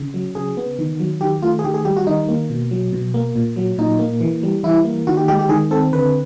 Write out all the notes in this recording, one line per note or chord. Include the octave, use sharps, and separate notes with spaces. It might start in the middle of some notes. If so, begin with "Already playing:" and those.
Already playing: C#3
F#3
C#3 G#4
B3
D#3
F#3
D#3 G4
A3 F4
G#4
D#3 G4
G#4
G3 G4
F#4
D#3 D#4
A#3
B2
F#3
B2
A#3
A#2
F#3
A#2 D#4
A#3
E3
G3
E3 E4
A#3
D#3 F#4
G4
G#3 G4
G4
D#3 G#4
C4 A4
D3 B4